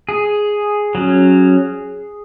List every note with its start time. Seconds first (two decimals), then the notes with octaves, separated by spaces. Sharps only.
0.09 G#4
0.95 F#3 C#4